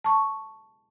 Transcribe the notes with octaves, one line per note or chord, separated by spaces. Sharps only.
A5 C#6